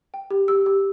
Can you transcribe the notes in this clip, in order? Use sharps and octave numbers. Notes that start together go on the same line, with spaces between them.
G5
G4
G4 E6
G4